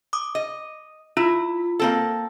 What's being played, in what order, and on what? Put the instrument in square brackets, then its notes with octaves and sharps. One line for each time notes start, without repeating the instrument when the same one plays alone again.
[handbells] D6 D#6
[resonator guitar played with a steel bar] D#5
[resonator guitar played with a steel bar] E4 [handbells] F4
[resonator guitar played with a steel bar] A#3 C4 A4